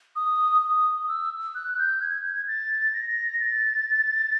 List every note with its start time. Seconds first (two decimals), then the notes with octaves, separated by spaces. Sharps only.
0.16 D#6
0.62 D#6
1.08 E6
1.55 F#6
1.73 F#6
1.78 G6
2.01 G#6
2.48 A6
2.94 A#6
3.40 A6